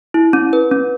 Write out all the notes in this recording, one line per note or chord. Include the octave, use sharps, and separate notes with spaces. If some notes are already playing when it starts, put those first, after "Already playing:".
E4
C#4
B4
C#4